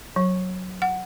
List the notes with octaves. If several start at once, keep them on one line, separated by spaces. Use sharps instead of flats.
F#3
F#5